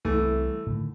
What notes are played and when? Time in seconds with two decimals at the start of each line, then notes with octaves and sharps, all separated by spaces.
0.05 C2 E3 A3
0.66 A2 D3 D#3